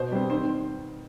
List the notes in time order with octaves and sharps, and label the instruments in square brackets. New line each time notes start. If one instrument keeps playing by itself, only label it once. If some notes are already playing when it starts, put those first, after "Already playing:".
Already playing: [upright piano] B2 [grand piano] C5
[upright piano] G3 C4
[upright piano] D#3 [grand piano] C5